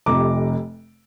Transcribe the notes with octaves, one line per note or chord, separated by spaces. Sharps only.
F1 F2 C3 A#5 D6